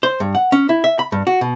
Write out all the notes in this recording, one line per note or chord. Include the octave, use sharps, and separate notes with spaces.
C5
G2
F#5
C#4
E4
E5
B5
G2
F#4
B2